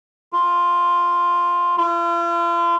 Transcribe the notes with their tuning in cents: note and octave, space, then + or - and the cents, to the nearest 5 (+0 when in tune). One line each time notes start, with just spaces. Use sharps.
F4 +0
F4 -40